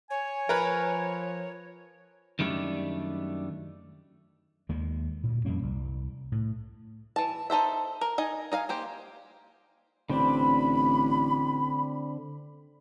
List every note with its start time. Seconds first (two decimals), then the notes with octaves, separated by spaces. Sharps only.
0.10 C#5 G#5
0.49 F3 A#4 B4
2.39 F#2 D#3 G3 A3 D4
4.69 D#2 D#3 G#3 A#3
5.23 D2 A#2
5.45 F2 G3 A#3 C#4
5.63 C2 G3
6.32 A2
7.16 E3 A5
7.50 D#4 A4 C5 E5
8.01 A#4
8.18 D#4 D#5 G#5
8.52 D#4 D#5 F5 G#5
8.69 A#3 G4 C5
10.10 A1 D3 C4 D4 B5